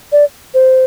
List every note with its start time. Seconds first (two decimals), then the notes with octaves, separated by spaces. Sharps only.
0.12 D5
0.54 C5